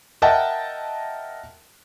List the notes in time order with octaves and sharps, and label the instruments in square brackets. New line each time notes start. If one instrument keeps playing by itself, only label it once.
[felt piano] A#4 D#5 E5 F#5 G5 A5